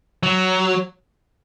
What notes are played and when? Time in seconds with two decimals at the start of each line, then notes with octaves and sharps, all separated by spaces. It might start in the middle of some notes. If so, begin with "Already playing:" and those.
0.23 F#3